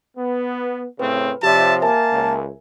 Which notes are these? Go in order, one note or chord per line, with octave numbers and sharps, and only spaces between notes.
B3
A2 C#3 C4 B4
C3 F3 G4 C#5 D5 E5 A5
A#3 A#4 E5 G#5 A5
C#2